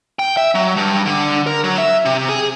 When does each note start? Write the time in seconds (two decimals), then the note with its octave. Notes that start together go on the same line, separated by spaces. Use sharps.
0.19 G5
0.37 E5
0.55 F#3
0.77 G2
1.06 D3
1.47 A#4
1.64 F#3
1.78 E5
2.05 C3
2.29 G#4